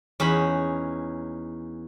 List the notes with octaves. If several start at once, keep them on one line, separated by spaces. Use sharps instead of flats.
E2 C#4 D#4 B5